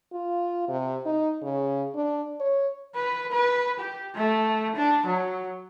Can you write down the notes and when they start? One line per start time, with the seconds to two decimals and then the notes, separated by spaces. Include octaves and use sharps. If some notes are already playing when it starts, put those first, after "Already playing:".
0.13 F4
0.68 C3
1.05 D#4
1.43 C#3
1.95 D4
2.40 C#5
2.95 B4
3.32 B4
3.79 G4
4.15 A3
4.76 D4
5.06 F#3